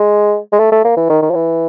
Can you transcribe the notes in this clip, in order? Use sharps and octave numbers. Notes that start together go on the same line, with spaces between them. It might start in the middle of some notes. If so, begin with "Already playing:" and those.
Already playing: G#3
G#3
A3
A3
A#3
E3
D#3
D#3
F3
E3